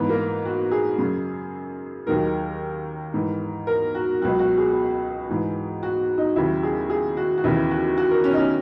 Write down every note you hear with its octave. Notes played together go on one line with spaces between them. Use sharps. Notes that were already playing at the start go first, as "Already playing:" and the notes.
Already playing: G#2 E3 B3
A#3
F#4
G#4
F#2 C#3 F#3
D#2 D#3 F#3 A#4
G#2 E3
A#4
F#4
C#2 B2 F#3 F#4
F#4
G#4
G#2 E3
F#4
D#4
D#2 C#3 F#3 E4
G#4
G#4
F#4
F#4
D#2 C#3 E3 E4
F#4
F#4
A#4
C#4
D#4
C#4